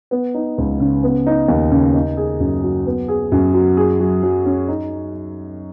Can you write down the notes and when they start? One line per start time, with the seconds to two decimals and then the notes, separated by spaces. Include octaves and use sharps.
0.11 B3
0.34 D#4
0.58 C#2
0.80 C#3
1.03 B3
1.27 D#4
1.48 D#2
1.71 C#3
1.94 D#4
2.17 G#4
2.40 F#2
2.63 F#3
2.86 B3
3.08 G#4
3.32 F#2
3.54 F#3
3.77 G#4
4.00 F#3
4.23 F#3
4.45 C#4
4.68 D#4